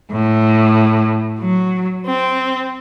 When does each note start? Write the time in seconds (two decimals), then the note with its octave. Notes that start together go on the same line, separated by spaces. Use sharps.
0.12 A2
1.39 F#3
2.05 C4